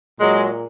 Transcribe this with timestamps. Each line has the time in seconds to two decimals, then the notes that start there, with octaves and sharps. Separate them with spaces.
0.20 A#2 F#3 G#3